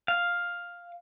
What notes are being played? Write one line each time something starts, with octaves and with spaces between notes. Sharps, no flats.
F5